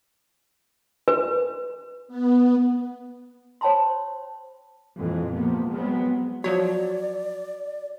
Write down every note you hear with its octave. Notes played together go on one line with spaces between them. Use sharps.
B4
B3
C5 C#5 G5 A5 B5 C6
F2 A#2 E3 G#3
C3 F3 A#3 B3
F#3 G#3 B3 C4
F3 F#3 F#4 C#5 D5